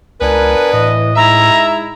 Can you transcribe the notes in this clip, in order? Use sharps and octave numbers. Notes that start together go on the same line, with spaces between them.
C#2 B3 D4 A#4 B4 G#5
A2 E3 D#5
G#3 D#4 E4 E5 A#5